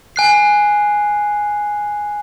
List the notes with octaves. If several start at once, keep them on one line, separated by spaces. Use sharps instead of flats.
G#5 F#6 C7